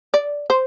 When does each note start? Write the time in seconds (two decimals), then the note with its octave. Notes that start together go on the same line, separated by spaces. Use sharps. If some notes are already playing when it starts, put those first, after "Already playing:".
0.14 D5
0.50 C5